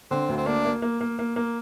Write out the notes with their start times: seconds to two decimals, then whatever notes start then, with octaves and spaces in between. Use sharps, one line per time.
0.11 D3 C4
0.29 D2
0.37 C4
0.46 A#3 D4
0.65 A#3
0.82 A#3
1.01 A#3
1.19 A#3
1.36 A#3